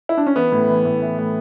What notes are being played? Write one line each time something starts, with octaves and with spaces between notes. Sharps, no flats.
E4
D4
C#4
E3 B3
A2
E3
A2
E3
A2